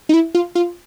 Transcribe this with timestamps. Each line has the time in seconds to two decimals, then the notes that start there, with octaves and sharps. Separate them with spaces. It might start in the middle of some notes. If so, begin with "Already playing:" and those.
0.09 D#4
0.14 E4
0.35 F4
0.55 F4